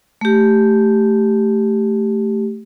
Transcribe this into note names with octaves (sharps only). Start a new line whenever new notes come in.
A3 G4